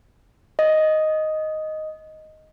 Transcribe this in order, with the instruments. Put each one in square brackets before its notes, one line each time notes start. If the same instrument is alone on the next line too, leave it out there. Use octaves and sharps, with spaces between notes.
[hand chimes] D#5